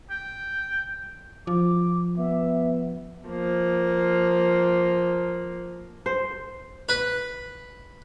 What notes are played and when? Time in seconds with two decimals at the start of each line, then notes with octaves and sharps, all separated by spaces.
0.10 G5
1.47 F3 D6
2.17 B3 E5
3.27 F3 A#3
6.06 C5
6.89 B4